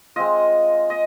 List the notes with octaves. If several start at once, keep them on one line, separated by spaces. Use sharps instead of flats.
G#3 C4 F4 D#5
D#5